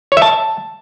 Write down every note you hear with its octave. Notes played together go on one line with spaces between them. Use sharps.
C#5
E5
A5